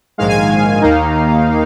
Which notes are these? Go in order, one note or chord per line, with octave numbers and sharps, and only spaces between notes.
A#1 G#2 D#3 G#3 F5
G#5
F5
D#2 D#3 A#3 D#4